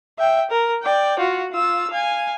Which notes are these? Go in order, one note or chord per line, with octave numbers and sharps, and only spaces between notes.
E5 G5
A#4
D5 G5
F4 F#4
F4 E6
F5 G#5